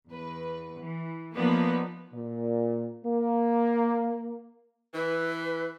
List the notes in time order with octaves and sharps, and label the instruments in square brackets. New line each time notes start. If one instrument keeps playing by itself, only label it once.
[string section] E2 B4
E3
F3 A#3 B3 D#4 B4 D5
[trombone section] A#2
A#3
[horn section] E3 [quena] B4